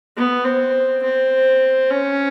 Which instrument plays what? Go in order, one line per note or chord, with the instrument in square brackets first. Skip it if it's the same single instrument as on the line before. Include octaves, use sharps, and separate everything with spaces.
[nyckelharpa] B3
C4
C4
C#4